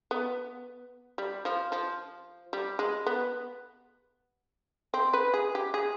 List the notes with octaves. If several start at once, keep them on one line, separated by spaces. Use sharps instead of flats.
B3
G3
F3
F3
G3
G#3
B3
C4
B4
G#4
G4
G#4